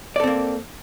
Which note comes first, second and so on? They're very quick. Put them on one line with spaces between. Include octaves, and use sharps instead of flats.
D5 A4 C4 A#3